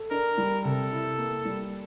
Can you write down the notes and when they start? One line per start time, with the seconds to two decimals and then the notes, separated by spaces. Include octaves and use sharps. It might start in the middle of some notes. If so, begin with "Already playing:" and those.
Already playing: A4
0.11 D4 A#4
0.37 G3
0.65 C3 A4
0.92 E4
1.18 A#3
1.45 G3